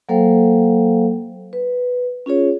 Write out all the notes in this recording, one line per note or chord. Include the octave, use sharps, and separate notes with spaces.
F#3 A#3 A4 C5 F5 G5
B4
C#4 F4 G#4 C#5